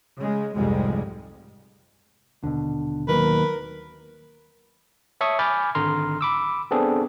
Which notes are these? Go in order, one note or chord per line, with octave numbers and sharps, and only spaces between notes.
C#3 G#3
F1 C2 F2 G#2 G3 G#3
D#1 B2 D3
D#3 F#3 A#3 A#4 B4
C#5 E5 A5 C#6 D#6
G#5 B5 D6 F6 G6 A6
G#1 D3 A#5 C6 F6
B5 D6 E6
B3 C4 D4 G#4 A4